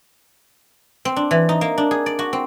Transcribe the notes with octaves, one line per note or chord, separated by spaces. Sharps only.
C4
D4
E3
D#4
A#3
D4
G#4
D5
F#4
C4